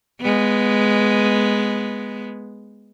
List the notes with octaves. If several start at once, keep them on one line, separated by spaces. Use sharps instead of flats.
G#3 B3